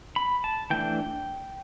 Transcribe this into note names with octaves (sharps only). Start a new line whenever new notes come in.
B5
A5
E3 A3 D4 G5